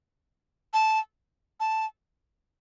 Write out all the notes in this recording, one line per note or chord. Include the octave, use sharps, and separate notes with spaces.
A5
A5